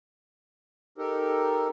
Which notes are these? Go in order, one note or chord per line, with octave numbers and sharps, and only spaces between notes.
D#4 G4 A4 A#4